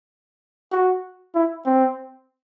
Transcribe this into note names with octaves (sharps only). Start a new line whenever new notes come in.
F#4
E4
C4